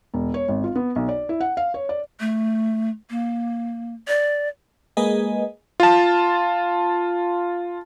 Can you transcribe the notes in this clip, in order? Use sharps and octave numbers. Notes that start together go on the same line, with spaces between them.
E1
C#5
G#1
F4
B3
B1
D5
E4
F#5
F5
C#5
D5
A3
A#3
D5
G#3 A#3 G#4 B4 D#5 G#5
F4 A5